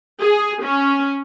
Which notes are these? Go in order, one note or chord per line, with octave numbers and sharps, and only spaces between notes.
G#4
C#4